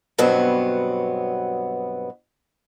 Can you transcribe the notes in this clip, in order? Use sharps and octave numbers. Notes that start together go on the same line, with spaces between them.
G2 B2 F#3 B3 C4